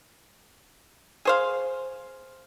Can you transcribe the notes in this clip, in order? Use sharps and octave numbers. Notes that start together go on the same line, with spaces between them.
G#4 C5 F5